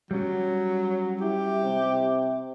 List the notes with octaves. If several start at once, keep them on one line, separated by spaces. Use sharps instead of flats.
F#3 G3 C#4
E4 G4
C3